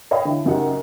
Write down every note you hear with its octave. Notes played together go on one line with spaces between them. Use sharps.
B4 C#5 D#5 F5 G5 B5
D3 E4
F#1 F#2 D#4 G4 F#5